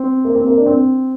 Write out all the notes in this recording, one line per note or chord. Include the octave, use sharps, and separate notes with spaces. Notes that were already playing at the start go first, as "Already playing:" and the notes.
Already playing: C4
A#3
C4
A#3
D4
C4